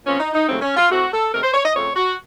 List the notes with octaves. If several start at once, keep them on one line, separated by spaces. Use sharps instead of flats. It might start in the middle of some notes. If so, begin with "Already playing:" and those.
A#2 F3 C4 C#4
D#4
D#4
D#2 C#3 F#3 A3 C4
C#4
F4
A2 A3 C4 F#4
A4
C3 D#3 A3 A#4
C5
C#5
D#5
F2 C#3 A3 C4 C#5
F#4